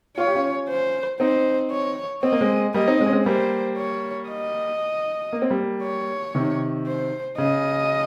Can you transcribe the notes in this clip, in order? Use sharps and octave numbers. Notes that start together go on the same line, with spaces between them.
F4 C#5
G4
C#4 F4
C5
C4 D#4 C5
C#5
C4 D#5
A#3
G#3 C4
G3 A#3 D#5
C4 D#4
G#3 C4
C#4
G#3 C4
G3 A#3 C5
C#5
D#5
A#3
C4
G3 A#3
C#5
C3 D#3
C5
C#3 D#5